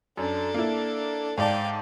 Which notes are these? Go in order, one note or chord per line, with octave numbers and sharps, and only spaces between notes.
F#2 D4 A4
A#3 E4
G#2 D5 F5 G5 A5